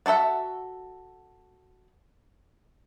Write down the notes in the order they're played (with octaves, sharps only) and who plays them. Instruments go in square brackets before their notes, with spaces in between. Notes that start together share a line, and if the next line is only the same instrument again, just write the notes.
[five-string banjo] D4 F#4 A4 E5 F#5